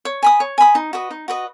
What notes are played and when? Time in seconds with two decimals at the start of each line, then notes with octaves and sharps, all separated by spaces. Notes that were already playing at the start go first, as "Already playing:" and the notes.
0.05 C#5
0.23 G#5 B5 D#6
0.40 C#5
0.58 G#5 B5 D#6
0.75 D#4
0.93 F#4 B4 D#5
1.11 D#4
1.28 F#4 B4 D#5